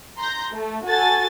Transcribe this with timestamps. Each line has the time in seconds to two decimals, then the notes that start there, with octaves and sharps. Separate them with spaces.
0.18 A#5 C6 G6 A#6
0.53 A3
0.85 F#4 A4 G#5 A6